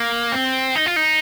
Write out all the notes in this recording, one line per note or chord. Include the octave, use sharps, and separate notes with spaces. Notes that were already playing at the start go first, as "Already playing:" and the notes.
Already playing: A#3
C4
D#4
F4
D#4